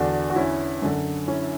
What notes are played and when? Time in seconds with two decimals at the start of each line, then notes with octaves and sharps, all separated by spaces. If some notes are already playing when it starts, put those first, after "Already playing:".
Already playing: E2 D3 D4 F#4
0.30 F#4
0.36 C#4 E4
0.82 F#2 D3
1.28 C#4 E4